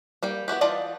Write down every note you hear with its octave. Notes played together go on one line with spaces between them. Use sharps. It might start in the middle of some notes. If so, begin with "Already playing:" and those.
G3 A#3 G5
B3 E4 F#4 G4
E3 F4 D5 D#5 A5